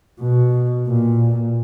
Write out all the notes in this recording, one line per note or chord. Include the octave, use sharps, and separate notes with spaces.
B2
A#2